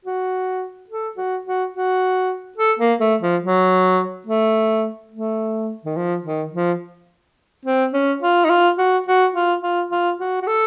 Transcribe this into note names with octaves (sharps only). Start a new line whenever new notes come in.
F#4
A4
F#4
F#4
F#4
A4
A#3
A3
F3
F#3
A3
A3
D#3
F3
D#3
F3
C4
C#4
F4
D#4
F4
F#4
F#4
F4
F4
F4
F#4
F#4
A4